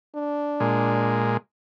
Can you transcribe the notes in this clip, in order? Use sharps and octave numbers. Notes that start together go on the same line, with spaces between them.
D4
A#2 G#3